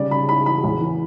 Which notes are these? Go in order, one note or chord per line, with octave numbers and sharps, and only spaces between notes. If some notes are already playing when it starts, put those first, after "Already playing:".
Already playing: C#3 G3 D5
C#3 B5
E4 B5
E3 B5
E2
E3